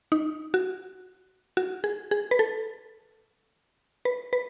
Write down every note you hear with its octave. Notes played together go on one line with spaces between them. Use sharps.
D#4
F#4
F#4
G#4
G#4
B4
A4
B4
B4